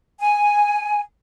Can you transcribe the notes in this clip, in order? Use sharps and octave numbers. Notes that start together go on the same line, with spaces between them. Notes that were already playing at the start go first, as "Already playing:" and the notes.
G#5